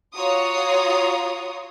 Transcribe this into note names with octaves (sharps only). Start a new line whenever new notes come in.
F4 F#4 C#5 A#5 C6 D#6